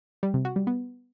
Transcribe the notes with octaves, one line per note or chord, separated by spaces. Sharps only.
G3
C3
F#4
G3
B3